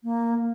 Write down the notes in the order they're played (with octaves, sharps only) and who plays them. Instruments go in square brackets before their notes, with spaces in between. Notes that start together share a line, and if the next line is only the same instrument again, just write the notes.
[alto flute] A#3